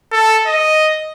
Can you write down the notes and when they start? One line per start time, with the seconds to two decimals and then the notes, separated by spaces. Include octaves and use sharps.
0.12 A4
0.47 D#5